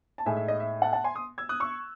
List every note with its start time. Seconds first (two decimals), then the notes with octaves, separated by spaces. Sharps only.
0.18 A5
0.26 A2 G#3 D#4 E5 G#5
0.37 E5
0.48 D#5
0.60 E5
0.82 F#5 A5
0.93 F#5 A5
1.04 G#5 C6
1.15 C6 D#6
1.38 E6 G#6
1.49 D#6 F#6
1.60 C#6 E6